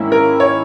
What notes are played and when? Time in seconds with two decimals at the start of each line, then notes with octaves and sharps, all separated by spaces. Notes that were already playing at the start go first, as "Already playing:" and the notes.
Already playing: G#2 D#3 A#3 C#4 E4
0.12 A#4
0.40 C#5